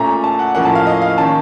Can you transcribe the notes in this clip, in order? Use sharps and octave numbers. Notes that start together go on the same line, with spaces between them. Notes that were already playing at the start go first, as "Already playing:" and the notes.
Already playing: A#2 A3 C#4 A#5
A5
F#5
A2 F3 A#3 C#4 F#5
A5
F5
D#5
F5
D#3 A#3 C#4 A5